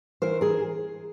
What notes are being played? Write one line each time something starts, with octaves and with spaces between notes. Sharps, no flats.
E3 A#4 C5
G#4 A#4